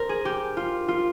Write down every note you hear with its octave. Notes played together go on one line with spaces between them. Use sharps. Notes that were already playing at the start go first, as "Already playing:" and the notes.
Already playing: A#4 C5
G#4
G4
F4
F4